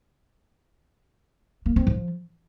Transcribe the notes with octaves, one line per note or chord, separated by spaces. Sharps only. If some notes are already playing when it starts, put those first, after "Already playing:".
A#3
C4
F3